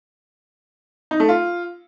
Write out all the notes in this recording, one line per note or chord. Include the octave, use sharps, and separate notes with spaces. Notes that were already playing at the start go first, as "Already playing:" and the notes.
D#4
A3
F4